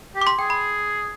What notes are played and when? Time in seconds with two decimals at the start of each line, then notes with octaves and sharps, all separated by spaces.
0.15 G4
0.21 D6
0.27 C6
0.39 G#4 G5
0.50 B5